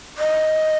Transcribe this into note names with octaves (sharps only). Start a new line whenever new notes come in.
D#5